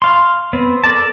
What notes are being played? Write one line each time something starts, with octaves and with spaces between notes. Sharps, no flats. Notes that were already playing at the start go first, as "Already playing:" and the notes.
F5 C6
B3 C4
A4 A#4 D5 A5